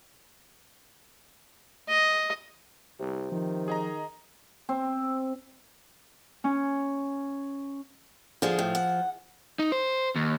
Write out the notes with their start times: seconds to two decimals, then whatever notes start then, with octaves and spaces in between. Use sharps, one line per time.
1.89 D#5
3.00 C2 C3
3.32 D#3 F3
3.68 G#4 D#5 A#5
4.69 C4
6.44 C#4
8.42 D3 F3 G#4
8.59 A2
8.75 F#5
9.59 D#4
9.72 C5
10.16 D#2